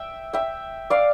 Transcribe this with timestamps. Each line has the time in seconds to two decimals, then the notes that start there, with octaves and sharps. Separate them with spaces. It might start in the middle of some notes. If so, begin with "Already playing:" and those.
Already playing: E5 G5
0.33 E5 G5
0.90 D5 F5